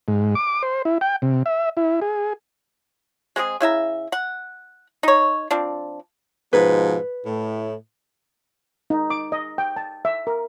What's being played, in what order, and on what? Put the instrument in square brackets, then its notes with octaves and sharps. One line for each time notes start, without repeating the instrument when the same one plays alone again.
[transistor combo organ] G#2
D6
C5
E4
G5
C3
E5
E4
G#4
[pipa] G#3 C4 G4 G#4
C#3 E4 E5 A#5
F#5
D#4 C#5
F3 C4 D4
[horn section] G#2 B2 F3 [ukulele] B4
[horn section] A2
[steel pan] D#4
D6
D#5
G5
A5
E5
A#4